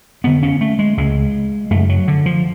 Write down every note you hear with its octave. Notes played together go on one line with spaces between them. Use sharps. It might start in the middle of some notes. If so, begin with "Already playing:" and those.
F2 D3 B3
C#4
A3
G#3
C#2 C#3 G#3
F#2 C#3 A3
F#3
D3
F3